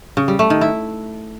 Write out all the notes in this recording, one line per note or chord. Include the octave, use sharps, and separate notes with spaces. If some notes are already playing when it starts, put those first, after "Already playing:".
C#3
G3
A3
D#3
E4